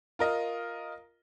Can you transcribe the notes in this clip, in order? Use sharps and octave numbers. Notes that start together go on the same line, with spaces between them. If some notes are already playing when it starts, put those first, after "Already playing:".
F4 A#4 D#5